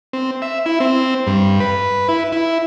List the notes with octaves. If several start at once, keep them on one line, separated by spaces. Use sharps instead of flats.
C4
E5
E4
C4
G2
B4
E4
E4